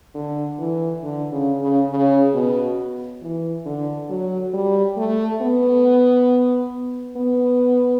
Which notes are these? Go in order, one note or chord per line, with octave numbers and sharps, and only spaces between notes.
D3
E3
D3
C#3
C#3
C#3
B2
E3
D3
F#3
G3
A3
B3
B3